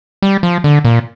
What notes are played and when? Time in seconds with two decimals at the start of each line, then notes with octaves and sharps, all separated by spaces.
0.22 G3
0.43 F3
0.64 D3
0.85 A#2